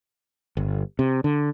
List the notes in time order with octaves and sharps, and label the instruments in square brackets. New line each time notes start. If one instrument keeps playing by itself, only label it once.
[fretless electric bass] G1
C3
D3